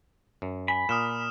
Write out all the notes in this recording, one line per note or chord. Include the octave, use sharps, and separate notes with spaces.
F#2
G#5 B5
A#2 D#6 F6 E7